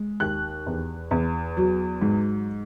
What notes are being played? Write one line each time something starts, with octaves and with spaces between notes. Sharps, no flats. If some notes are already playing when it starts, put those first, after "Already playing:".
Already playing: G#3
D#2 F#6
E2
E2
F#3
G#2